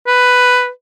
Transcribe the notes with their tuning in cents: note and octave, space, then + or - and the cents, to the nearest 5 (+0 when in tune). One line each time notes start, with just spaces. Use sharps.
B4 +5